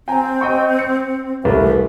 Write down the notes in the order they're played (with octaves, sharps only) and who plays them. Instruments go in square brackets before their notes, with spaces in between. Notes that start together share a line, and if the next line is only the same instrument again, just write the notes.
[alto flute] C4 [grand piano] G5 G#5 A#5
[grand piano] D#5 G5 C#6
C#7
[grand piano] E1 C2 A3 [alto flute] B4